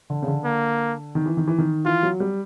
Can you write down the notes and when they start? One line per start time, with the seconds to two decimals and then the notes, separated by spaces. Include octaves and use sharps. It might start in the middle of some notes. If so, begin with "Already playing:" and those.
0.10 D3
0.22 C#3
0.28 D3
0.44 A#3
1.15 D#3
1.26 E3
1.37 D#3
1.47 E3
1.58 D#3
1.85 E3 F4
2.03 F#3
2.20 G3